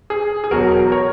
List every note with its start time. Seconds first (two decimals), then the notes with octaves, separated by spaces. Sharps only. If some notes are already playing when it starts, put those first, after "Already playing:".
0.10 G#4
0.44 G#4
0.51 E1 E2 B2 F#3 F#4 A#4
0.92 A#4 C#5